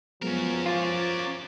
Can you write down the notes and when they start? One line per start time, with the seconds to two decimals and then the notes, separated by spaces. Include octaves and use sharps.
0.22 F3 F#3 G#3 B3 C#4 A#4
0.66 F4 D6 A6